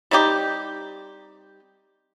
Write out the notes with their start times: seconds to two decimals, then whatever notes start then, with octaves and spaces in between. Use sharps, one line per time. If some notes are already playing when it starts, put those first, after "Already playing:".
0.11 G3 C4 D#4 G4